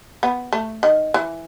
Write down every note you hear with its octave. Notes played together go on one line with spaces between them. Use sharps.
B3
A3
D#3
E3